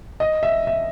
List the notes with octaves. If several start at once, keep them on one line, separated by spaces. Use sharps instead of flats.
D#5
E5
E5